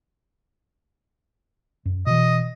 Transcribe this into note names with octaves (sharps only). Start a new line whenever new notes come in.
F#2
B2 E3 D#5